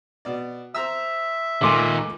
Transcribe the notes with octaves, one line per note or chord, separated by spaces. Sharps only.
B2 D5
C5 E5 A#5 E6
C#2 A#2 D#3 A3 G#5 C6 D6